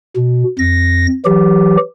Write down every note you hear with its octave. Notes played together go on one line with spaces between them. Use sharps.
B2
F2 A#6
E3 F#3 G4